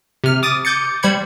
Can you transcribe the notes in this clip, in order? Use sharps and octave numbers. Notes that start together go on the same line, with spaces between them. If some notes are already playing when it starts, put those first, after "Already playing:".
C3 F6
D6 D#6 A6 D#7
D6 G6 A6 C#7
G3 C5 B5 G#6 C#7